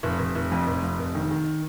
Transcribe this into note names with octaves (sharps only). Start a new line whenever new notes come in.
F1
F1
F1
F2
F1
F2
F1
D#3
D#3